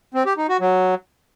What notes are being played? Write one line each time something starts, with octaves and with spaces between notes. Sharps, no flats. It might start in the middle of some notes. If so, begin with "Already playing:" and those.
C4
G4
D#4
F#4
F#3